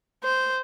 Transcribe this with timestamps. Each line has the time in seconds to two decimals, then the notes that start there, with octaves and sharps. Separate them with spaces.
0.24 C5